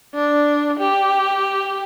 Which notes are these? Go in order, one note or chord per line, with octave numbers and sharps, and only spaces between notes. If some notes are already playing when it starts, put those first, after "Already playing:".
D4
G4